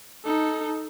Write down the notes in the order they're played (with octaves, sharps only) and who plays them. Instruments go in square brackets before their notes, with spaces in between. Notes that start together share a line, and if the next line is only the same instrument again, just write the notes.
[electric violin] D#4 A4